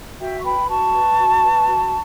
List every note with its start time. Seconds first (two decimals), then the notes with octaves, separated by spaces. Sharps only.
0.21 F#4 E5 G5
0.39 C#6
0.44 B4 G5 B5
0.69 F#4 A5 C#6
0.93 B4
1.18 F#4
1.42 B4
1.66 F#4